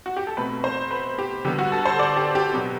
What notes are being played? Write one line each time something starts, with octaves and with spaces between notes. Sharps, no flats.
F#4
G4
A4
B2 A3 C4 B4
C5
B4
G4
D3 G3 B3 G4
F#4
A4
C5
D5
G4
G4
B2 F#3 B3